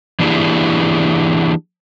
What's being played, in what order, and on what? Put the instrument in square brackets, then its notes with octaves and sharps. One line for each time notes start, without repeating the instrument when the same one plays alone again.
[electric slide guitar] E3 A#3 D4 E4 G4 G#4